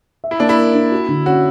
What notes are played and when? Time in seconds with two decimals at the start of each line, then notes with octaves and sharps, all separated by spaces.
0.24 E5
0.31 E4
0.40 A#3 D4
0.49 E4
0.58 A#4
0.74 D4
0.92 F#4
1.09 D3
1.26 C#4 F#4